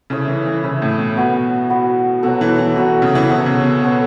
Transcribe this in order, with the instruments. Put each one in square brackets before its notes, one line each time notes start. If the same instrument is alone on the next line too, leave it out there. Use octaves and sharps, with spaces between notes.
[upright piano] C#3 [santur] E4 A4 C#5 E5
[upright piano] E3
E3
[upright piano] C#3 [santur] E4 A4 C#5 E5
[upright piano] A2
B2
[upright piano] B2 [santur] B3 F#4 B4
[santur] B3 F#4 B4
[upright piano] B2 [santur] F#3 B3 F#4 A4
[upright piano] E3
E3
[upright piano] B2 [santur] F#3 B3 F#4 A4
[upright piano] C#3
E3
[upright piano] B2 [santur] B3 A4 C#5
[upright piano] C#3
B2
[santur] B3 A4 C#5